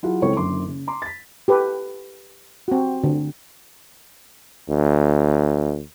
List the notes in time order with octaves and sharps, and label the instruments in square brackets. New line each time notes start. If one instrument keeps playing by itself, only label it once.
[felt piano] F#3 E4 F4 G#4 F#5
C#2 C4 E4 A4 C#5 C#6
F#1 F#2 D3 C6 D6
C#3
A#5 C6 D6
A6 B6
[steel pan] G4 A4 B4
C4 F#4
D3
[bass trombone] D2